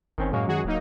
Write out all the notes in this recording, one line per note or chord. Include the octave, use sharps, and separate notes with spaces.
G1 D#3 C4 C#4
F#2 A2 G#3 A#3 C#5
D#3 F#4 G#4
D1 F#3 A#3 D#4